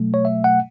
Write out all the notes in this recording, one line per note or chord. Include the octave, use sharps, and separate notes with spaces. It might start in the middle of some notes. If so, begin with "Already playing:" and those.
Already playing: B2 F#3 A3
C#5
E5
F#5